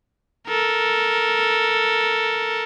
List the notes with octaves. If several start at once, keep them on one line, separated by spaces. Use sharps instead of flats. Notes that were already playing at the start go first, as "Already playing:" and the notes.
A4 A#4